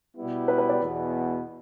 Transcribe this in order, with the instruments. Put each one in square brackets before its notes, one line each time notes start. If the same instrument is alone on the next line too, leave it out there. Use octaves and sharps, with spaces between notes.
[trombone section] B2 G3 B3 E4 G4
[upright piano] B4
B4
D5
[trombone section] E2 B2 B3